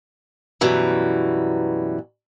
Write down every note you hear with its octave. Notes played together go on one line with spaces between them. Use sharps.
F#2 B2 E3 G3